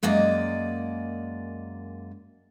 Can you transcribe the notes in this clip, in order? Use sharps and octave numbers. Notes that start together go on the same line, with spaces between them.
F#2 G#3 A#3 D5 D#5